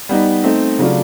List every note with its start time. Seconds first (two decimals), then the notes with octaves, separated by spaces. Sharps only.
0.09 G3 B3 D#4
0.44 A3 C4 D#4
0.79 C#3 F#3 A3 D4 F4